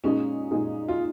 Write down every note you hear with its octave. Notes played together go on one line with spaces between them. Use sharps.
A#2 G#3 C#4 D#4 G#4
A#2 G#3 D#4 G#4
F4